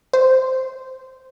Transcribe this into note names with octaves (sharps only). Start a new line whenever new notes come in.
C5